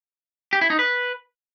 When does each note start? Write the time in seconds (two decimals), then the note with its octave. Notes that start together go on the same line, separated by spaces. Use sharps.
0.53 G4
0.61 E4
0.70 D#4
0.79 B4